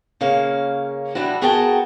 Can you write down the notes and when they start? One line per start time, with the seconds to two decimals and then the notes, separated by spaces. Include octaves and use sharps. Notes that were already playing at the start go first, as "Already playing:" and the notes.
0.21 C#3 A#3 C#4 F5
1.15 F3 G3 D4 E4 F#4
1.42 B3 F#4 G#4 A#4 G5 A5